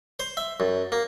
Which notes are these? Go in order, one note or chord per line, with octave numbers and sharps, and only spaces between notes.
C5
E5
F#2
A#3